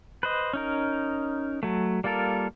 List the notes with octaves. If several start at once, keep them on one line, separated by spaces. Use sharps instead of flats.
B4 C5 D#5
C#4 D#4 A#4
F#3 A3
G3 A#3 F4 A4 A#4